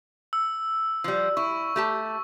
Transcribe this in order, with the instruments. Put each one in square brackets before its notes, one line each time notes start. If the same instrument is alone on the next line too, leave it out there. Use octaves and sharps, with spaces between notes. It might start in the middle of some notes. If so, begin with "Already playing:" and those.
[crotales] E6
[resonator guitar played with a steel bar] F3 G3
[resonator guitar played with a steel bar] E4 [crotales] C#6
[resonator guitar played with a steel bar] A3 G4 A5